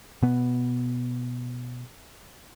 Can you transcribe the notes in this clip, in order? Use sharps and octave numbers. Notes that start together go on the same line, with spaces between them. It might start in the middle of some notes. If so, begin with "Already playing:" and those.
B2 B3